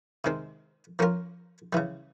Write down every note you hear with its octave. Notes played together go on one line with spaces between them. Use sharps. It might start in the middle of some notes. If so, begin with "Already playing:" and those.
C3 D#3 G#3 C4
F3 A#3 C#4 F4 A#4
C#3 E3 G3